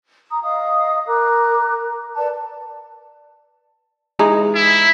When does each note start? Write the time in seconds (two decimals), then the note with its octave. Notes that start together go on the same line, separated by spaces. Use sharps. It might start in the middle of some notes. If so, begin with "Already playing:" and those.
0.30 A#5 D#6
0.42 D#5 F5 D#6
1.08 A#4 A#5 D6 F#6
2.16 B4 D5 A5
4.19 E3 G#3 D#4
4.55 E4